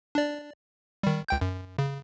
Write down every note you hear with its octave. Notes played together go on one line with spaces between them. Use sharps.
D4 D5
D#3 G3
C#2 G5 G6
F#2
C#3